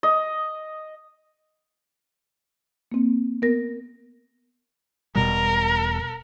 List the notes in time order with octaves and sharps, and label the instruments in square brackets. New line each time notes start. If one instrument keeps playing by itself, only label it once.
[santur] D#5
[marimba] A#3 C4
B3 A#4 A#6
[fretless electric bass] E1 B2 G3 [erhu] A#4